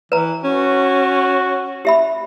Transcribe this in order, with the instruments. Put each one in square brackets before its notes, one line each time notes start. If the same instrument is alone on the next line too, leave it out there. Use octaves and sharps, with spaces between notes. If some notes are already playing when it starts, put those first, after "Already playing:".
[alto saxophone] E3 [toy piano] B4 A#5
[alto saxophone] C#4 [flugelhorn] F#4
[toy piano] G4 E5 B5